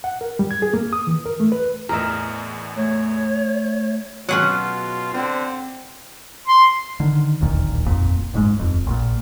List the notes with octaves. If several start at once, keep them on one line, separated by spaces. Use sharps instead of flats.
F#5
A#4
G3
G#6
G#4
A#3
D#6
E3
A#4
A3
B4
E2 A2 A#4 D#5 E5
A3 C#5
B2 F#3 C#4 F4 G#4 F#5
D3 C4
C6
D3 D#3
D1 A#1 D#2 A#2
D#1 G#1 F2 A#2
F#1 G#2 G#3
D#1 F2
A#1 A#2